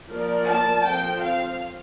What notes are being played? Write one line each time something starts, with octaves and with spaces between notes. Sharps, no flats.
F3 A#3 F4 A#4 D5
A5
F3 C4 F4 A4 C5 G5
F5